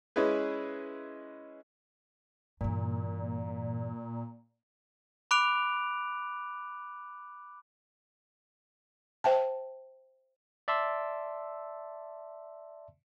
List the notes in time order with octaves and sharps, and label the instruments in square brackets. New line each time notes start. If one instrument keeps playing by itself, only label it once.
[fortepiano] G#3 C#4 E4 G#4 B4
[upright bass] G2 E3 [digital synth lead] A#2
[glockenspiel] B5 D6 F#6 D7 F7
[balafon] C5 E5 G5 A5
[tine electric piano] D5 E5 A5 C6 E6